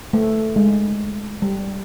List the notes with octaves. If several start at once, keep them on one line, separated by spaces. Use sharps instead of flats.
A3
G#3
G3